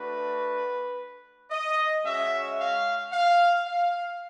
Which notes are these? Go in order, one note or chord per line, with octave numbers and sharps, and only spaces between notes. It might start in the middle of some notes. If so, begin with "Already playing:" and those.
Already playing: A3 D4 F#4 B4
D#5
G#3 C#4 F#4 E5
F5
F5
F5